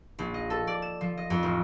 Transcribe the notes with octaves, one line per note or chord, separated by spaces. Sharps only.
A#1
D#5
A4
D5
E7
F3
D#5
F2
A1